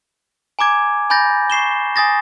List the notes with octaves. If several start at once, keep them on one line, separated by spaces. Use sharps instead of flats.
G#5 A#5 D6 G#6
G#5 B5 G6 A6 A#6
C#6 C7 E7 G7
G#5 D#6 A6 A#6